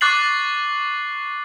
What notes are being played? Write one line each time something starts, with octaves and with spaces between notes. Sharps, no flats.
C#6 D6 F#6 A6 C7 F#7